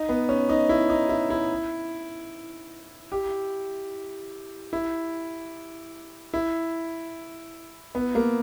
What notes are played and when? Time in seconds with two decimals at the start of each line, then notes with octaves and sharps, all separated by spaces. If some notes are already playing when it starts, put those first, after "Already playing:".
Already playing: D#4
0.09 B3
0.29 C#4
0.49 D#4
0.69 E4
0.90 D#4
1.09 E4
1.30 E4
3.12 G4
4.73 E4
6.34 E4
7.95 B3
8.15 A#3